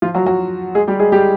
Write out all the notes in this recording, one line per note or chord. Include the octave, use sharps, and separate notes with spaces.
F3 F4
F#3 F#4
F#3 F#4
G#3 G#4
G3 G4
G#3 G#4
G3 G4